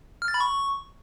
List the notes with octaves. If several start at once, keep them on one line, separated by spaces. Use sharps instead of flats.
F6
A6
B5
C#6